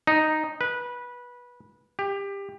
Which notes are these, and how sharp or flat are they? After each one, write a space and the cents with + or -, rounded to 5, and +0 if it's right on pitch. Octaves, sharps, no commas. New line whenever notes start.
D#4 -5
B4 -15
G4 +20